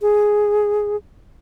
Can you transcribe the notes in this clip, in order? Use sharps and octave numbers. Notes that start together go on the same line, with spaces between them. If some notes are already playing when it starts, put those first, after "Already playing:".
G#4